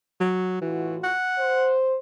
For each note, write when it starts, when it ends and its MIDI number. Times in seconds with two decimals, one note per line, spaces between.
0.21 0.59 54
0.61 1.10 45
0.61 0.97 52
0.61 1.10 65
0.61 1.10 66
1.04 1.74 78
1.39 1.96 72